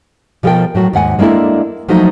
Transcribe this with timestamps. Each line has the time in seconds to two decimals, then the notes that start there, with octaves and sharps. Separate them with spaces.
0.43 B2 F3 G4 A4 A#4 G5
0.75 A2 F#3 F#4
0.93 D#2 G#2 F#5 G#5
1.19 G#3 A#3 D4 E4 A4
1.88 F3 F#3 A3 A#3 D#4